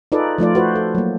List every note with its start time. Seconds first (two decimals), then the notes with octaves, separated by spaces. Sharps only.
0.12 D#4 F4 G#4 A4 B4 D5
0.38 F3 A3 F4 D5
0.55 F#4 B4 C5
0.76 A4
0.95 F#3 A#3